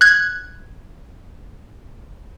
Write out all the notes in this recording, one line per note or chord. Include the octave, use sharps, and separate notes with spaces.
F#6 G#6